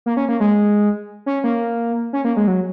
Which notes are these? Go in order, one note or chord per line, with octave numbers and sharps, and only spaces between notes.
A#3
C#4
A#3
G#3
C#4
A#3
C#4
A#3
G#3
F#3